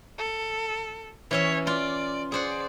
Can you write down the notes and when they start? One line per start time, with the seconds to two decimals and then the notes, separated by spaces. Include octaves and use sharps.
0.18 A4
1.31 E3 C#4 C#5 E5
1.67 F4 D5
2.32 G#4 C5 D5 F#5